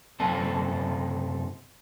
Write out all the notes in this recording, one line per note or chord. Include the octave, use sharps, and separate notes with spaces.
F#2 C3 C4 D#4 A4 A5